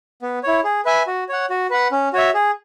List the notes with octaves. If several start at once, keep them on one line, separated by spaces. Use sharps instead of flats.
B3
E4 C#5
G#4
B4 E5 G#5
F#4
C#5 F#5
F#4
B4 F#5
C#4
F#4 C#5 E5
G#4